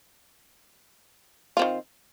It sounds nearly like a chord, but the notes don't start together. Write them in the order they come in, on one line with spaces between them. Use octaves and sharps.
F4 C4 D#3